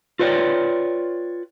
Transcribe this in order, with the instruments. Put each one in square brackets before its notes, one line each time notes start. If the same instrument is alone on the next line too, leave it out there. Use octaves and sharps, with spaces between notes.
[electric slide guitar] F4 B4 C#5 D5 G5